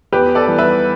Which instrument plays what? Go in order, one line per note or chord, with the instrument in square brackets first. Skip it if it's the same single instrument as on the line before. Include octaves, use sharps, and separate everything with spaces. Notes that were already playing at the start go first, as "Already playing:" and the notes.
[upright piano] E2 G4 B4
A4 D5
E3 G3 B3
B4 E5